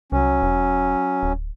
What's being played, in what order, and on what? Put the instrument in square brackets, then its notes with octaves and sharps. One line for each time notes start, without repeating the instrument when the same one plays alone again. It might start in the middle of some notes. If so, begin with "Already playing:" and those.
[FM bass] C2 [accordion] F#3 C#4
[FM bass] E1
D1